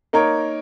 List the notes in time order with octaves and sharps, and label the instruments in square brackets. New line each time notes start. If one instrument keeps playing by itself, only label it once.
[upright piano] A#3 D#4 A#4 C#5